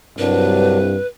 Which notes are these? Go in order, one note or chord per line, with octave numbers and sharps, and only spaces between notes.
C2 G2 F#3 D4 B4